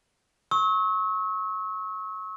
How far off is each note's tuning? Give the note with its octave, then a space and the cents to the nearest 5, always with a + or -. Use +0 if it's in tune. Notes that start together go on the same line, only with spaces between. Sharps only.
C#6 -25 E6 -40